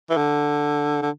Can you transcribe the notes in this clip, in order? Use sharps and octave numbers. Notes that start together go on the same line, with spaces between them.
E3
D3
D3